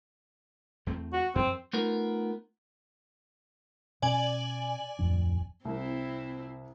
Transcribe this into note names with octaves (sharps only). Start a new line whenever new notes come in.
E2 A3 C4
F#4
F#2 F3 C4
A3 B3 D#4 F4 A#4
B2 C#4 D5 G#5 F#7
D1 F2 D4
C2 C4 E4